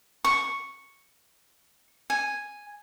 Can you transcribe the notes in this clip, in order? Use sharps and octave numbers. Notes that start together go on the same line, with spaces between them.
C#6
G#5